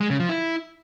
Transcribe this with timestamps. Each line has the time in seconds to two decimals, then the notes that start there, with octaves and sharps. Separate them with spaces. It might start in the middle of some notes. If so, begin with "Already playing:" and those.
0.01 G#3
0.10 C#3
0.20 F3
0.29 E4